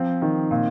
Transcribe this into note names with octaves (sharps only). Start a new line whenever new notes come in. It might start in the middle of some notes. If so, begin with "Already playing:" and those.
Already playing: F3 C4
D#3
A#2